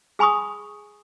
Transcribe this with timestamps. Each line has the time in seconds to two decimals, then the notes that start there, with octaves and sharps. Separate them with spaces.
0.19 G#4 G#5 B5 C#6 D#6